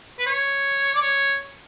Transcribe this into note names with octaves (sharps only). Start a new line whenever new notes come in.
B4
C#5
D5
C#5